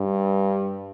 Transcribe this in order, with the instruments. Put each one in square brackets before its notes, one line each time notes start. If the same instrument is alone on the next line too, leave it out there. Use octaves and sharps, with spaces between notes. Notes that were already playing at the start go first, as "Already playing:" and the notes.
Already playing: [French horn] G2